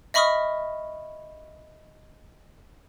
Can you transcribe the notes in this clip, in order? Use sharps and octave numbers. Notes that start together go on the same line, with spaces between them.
D#5 E5 B5 C#6 D#6 F6